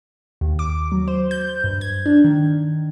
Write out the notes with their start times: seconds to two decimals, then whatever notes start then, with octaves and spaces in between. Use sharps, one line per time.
0.41 D#2
0.59 D6
0.92 F#3
1.08 C5
1.31 G6
1.64 G2
1.81 G#6
2.06 D4
2.24 D#3